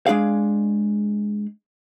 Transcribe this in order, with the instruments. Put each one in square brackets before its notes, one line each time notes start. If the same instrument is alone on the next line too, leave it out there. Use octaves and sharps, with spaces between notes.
[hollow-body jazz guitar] G#3 D4 G#4 F5